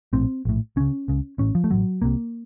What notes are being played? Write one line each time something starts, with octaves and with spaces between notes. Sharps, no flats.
A#1 A2 C4
A#1 A2
C#2 C#3 C#4
C#2 C#3
A1 A2 C#4
F3
A3
A1 A2 F#3
C2 C3 A#3